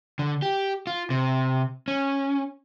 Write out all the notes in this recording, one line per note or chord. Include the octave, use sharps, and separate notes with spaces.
D3
G4
F4
C3
C#4